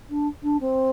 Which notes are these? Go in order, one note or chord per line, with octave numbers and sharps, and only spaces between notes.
D4
D4
C4